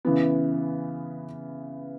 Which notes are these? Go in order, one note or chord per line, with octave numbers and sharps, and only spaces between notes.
C#3 E3 B3